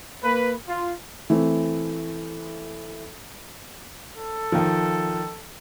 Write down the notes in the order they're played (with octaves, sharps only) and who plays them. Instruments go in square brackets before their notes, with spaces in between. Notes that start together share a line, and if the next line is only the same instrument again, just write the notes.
[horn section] A#3 B4
F4
[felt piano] E3 A3 C4
[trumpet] A4
[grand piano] D#3 F3